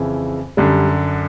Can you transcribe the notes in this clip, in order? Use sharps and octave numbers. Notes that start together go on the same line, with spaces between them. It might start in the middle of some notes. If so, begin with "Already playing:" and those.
Already playing: F2 C#3 E3
F#2 D3 G3